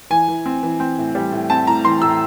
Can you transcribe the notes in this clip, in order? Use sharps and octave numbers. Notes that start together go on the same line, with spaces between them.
E3 G#5
E3
C4
E3
C4
A2
G3
A2
C4 A5
A2 A#5
E3 C6
A2 E6